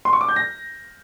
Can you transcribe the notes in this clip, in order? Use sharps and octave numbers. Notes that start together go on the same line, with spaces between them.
C6
C#6
D6
G6
A#6